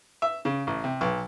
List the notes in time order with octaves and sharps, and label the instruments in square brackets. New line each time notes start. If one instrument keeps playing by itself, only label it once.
[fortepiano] E5
C#3
A1
C3
B1